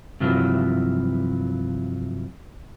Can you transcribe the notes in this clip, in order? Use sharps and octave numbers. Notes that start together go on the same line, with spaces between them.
G2 C3 F3 F#3 E4